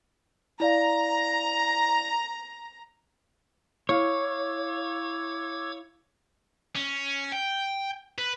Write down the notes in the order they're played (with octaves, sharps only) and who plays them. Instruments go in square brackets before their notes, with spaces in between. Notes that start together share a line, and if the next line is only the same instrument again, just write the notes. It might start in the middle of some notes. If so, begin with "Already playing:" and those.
[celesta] E4 D5 F5 [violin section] A#5
[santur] E4 F5 [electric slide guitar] C#5 [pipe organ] D6 E6 G#6
[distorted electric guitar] C#4
G5
B4